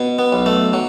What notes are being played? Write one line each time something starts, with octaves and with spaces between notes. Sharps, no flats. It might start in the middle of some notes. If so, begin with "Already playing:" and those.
Already playing: B2
B3
B1
A3
F#3